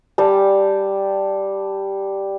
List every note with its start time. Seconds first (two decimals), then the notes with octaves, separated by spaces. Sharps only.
0.18 G3 G5 A5